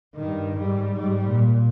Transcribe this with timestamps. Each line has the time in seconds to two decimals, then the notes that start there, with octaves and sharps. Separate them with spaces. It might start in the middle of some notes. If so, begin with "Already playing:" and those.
0.15 G2 D#3
0.57 G#2 G3
0.95 G#2 G3
1.28 A#2